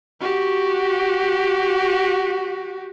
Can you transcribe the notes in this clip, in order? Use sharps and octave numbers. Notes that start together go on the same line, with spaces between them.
F#4 G4